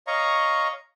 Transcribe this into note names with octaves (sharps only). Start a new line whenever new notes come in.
C#5 D#5 F5 A#5 C#6